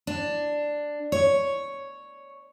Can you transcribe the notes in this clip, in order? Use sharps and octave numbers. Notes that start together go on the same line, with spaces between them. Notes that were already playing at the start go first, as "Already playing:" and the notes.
D4
C#5